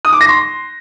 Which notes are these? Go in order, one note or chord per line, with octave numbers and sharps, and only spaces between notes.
D#6
D6
A#6
C6